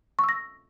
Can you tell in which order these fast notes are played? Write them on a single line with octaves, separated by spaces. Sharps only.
C#6 E6 A#6